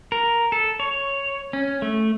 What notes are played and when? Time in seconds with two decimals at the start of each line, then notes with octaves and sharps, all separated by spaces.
0.12 A#4
0.52 A4
0.80 C#5
1.53 C#4
1.82 A3